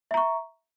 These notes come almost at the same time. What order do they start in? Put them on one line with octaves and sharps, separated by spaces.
E5 A#5 C#6